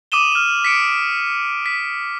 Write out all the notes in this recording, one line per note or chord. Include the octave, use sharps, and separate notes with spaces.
D6 D#6 D#7 E7 G7
F6 E7
B6 C#7 D7
B6